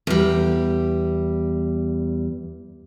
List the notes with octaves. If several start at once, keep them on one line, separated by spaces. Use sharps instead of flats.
E2 G3